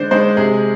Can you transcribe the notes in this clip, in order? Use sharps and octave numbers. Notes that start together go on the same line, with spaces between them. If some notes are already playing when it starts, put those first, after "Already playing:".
Already playing: D3 G#3 C5 D5
G#3 C5
C3 G#4